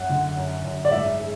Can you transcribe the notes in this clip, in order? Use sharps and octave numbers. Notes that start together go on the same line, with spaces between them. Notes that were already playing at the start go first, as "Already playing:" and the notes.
Already playing: F#2 F#5
D3
F#2
F#2
D5
G#2 E5
G#3